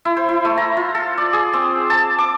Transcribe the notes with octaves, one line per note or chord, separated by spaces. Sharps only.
E4
C5
E4
A3
A#5
F4
A4
D5
G#4
C4
A5
D6